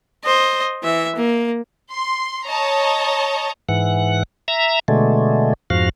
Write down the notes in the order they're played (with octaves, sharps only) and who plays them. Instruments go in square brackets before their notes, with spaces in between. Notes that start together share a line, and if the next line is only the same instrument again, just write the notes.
[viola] C5 D#5
E3 E5
A#3
[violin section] C6
C#5 D#5 A5 A#5
[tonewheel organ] G#2 E3 F#5
E5 A#5
B2 D3 G#3 A3
F2 G#2 F3 F#4 F5